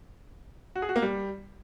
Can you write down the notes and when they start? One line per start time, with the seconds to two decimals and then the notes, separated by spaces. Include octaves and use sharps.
0.76 F#4
0.82 G#4
0.89 F#4
0.96 A#3
1.02 G3